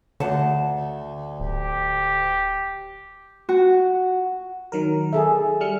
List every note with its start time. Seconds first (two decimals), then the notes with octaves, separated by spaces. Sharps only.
0.20 D2 D3 F#5 A5
1.40 D1 G4
3.49 F#4
4.72 D#3 F#3 A#4
5.13 G#4 A4 E5
5.61 G3 F6 C#7